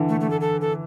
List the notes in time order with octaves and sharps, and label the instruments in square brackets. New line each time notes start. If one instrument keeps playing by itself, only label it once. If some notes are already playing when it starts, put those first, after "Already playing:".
Already playing: [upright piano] D3 E3
[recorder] A3
A3
A4
A4
A4